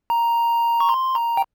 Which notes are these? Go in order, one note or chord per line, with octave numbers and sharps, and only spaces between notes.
A#5
C#6
C6
A#5
G5